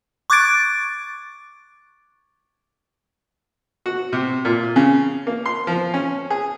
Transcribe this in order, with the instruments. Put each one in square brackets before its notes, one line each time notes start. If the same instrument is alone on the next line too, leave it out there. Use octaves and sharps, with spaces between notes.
[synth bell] C#6 D6 F#6 G#6 A6 D7
[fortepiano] F#4
C3
A#2
C#3
A#3
C6
F3
C#4
G#4